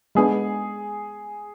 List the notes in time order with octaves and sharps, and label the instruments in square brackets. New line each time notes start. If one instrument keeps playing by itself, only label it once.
[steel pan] G#3 B3 D4 [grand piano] G#4